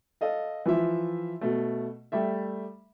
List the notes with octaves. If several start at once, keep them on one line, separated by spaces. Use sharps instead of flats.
A4 D#5 F5
E3 F3 F4 E5
B2 A3
G3 A3 E5